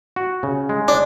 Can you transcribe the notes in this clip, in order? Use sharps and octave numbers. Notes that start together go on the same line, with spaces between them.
F#4
C#3
G#3
D4